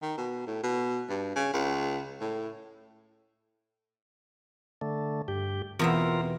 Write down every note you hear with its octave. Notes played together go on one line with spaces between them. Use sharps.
D#3
B2
A2
B2
G2
C#3
C#2
A2
D3 A3
G2 G4
E2 B2 C4 F4 A#4 E5